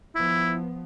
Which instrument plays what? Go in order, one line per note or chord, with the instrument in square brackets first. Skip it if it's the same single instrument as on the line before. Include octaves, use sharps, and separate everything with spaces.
[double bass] F3 B3 [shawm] E4